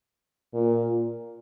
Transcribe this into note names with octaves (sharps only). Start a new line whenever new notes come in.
A#2